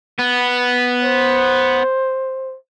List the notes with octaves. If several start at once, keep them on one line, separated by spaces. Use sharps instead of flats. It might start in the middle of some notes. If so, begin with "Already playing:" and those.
B3
C5